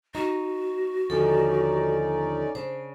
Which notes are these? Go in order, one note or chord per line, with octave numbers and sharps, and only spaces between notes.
D#4 F#4
D#2 D3 F3 C#4 D#4 A4 D5
C#3 D4 C5